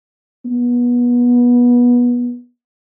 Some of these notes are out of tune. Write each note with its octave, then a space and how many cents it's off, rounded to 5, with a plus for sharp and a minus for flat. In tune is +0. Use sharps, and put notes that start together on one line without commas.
B3 -25